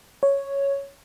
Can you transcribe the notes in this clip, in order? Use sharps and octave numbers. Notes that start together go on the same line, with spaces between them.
C#5